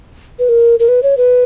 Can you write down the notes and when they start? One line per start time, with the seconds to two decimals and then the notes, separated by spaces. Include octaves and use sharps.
0.39 B4
0.49 A#4
0.79 A#4
0.88 B4
1.03 C#5
1.17 B4